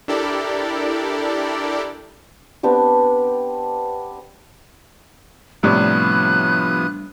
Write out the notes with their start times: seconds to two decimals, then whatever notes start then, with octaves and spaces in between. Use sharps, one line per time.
0.08 D4 E4 G4 A4 A#4 D5
2.63 B3 C4 D4 G4
5.63 A2 C3 F3 G3 B3 D4 D#6 F#6